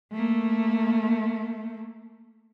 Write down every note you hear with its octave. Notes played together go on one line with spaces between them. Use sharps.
A3 A#3